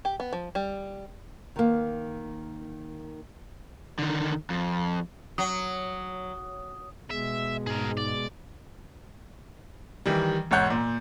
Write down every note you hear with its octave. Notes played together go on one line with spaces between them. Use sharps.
G4
B3
F3
G3
D#3 A#3
D3 D#3
F2
F#3 D#6
B2 G#3 E5
G#2 G#4 A#4
D5
D#3 E3 G3
E1 G#2 C#5 F#5 G6
A#2